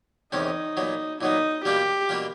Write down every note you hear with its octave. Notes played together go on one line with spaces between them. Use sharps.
E2 C3 D#3 G#3 C#4 D#4
A#2 F#3 B3
A#2 F#3 B3 D#4
B2 G3 A#3 D4 F4 G4
B2 G3 A#3 D4 F4